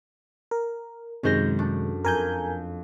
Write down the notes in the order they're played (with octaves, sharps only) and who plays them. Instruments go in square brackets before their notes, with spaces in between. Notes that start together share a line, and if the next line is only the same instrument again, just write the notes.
[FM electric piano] A#4
[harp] F#2 C5 A#6 [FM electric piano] C3 D#3 G#3
[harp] A3 D4
[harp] F2 [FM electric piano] A#4 G#5 G6